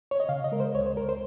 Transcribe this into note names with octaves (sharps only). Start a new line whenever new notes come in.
C#5
D#5
C#3 F5
D#5
G#3 A#4
C5
C#2 C#5
C5
C#2 A#4
C5